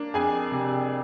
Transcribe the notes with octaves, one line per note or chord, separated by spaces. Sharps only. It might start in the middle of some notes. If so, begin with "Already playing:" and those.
Already playing: A#3 D4
F2 G#4 G#5
C3